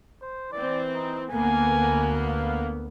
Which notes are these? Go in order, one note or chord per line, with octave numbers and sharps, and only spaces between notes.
C5
E3 C4 D5
D#4
D2 A#3 B3 G#5
F5